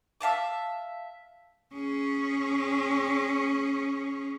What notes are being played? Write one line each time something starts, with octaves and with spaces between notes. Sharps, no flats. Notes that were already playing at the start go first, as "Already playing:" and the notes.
E5 F5 A5 D6
C#4 G#4